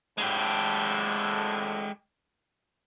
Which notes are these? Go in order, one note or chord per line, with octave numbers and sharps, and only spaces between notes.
F2 A2 D3 G#3 G4